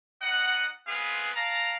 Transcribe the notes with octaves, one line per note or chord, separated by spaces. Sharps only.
G3 D#4 D#5 F#5
G#3 B3 C4 G#4 B4 F5
D5 F5 A5 A#5